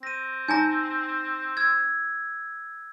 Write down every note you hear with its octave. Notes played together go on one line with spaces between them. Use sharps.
C4 A#6 D#7
D#4 G#5 A#5 G6 A#6
E6 G#6